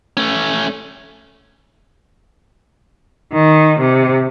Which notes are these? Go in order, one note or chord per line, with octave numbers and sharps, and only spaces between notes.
A3 C#4
D#3
C3